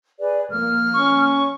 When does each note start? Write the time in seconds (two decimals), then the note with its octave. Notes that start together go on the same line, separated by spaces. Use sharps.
0.19 G#4 B4 D5
0.51 F3 A#3 F6
0.94 C#4 C#6